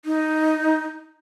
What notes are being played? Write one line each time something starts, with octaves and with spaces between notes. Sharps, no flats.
D#4